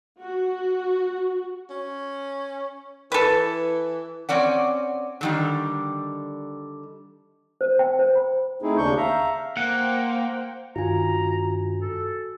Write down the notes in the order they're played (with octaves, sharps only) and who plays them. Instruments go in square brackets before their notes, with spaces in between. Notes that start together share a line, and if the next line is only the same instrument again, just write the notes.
[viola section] F#4
[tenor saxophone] C#4
[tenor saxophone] E3 [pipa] A4 B4
[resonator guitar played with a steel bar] C4 C#4 D5 F#5
D3 D#3 G3
[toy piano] C5
G5
C5
B5
[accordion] A3 C4 D#4 E4 G#4
D#2 C#3 D4 C#6 G6
E5 F5 A#5
[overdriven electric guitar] A#3 [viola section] C5 G5 [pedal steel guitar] F#5
[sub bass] G2 [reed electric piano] D#3 F4 [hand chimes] F#4 G#5 [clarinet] A#5
[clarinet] A4